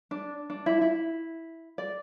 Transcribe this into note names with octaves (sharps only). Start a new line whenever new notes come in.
D4
D4
E4
E4
D5